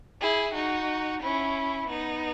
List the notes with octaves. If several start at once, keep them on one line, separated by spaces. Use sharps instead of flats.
E4 G#4
D#4 F#4
C#4 E4
B3 D#4